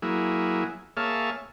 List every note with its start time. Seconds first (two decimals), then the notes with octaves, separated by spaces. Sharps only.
0.02 F#3 A#3 E4 G#4
0.97 A#3 G#4 C#5 E5 F5 A5